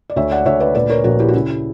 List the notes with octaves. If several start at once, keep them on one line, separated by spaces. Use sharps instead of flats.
D5
D2 C#5 E5
D5 F#5
D2 C#5 E5
B4 D5
A#2 B4 D5
A#4 C#5
A#1 F#4 A#4
E4 G4
F#4
C#3 E4